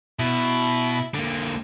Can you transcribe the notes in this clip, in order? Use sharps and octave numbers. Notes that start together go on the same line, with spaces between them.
B2 E4
D3 A#3